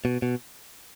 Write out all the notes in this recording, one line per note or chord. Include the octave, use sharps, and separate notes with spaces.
B2
B2